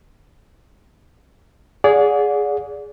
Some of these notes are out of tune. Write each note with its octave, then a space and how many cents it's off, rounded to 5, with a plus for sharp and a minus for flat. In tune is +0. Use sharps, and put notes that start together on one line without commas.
G#4 +0 D5 -30 F#5 -40